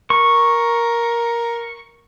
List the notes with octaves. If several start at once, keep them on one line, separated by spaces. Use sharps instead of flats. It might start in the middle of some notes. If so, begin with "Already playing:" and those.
A#4 C#6